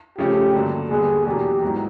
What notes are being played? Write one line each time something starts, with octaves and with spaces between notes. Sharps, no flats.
C#3 F3 A3 C#4 G4
G2 D3 F#3 A#3
D#2 D3 G3 B3 G#4
E2 B2 F#3 A#3 G4
G#2 D#3 F#3 B3 E4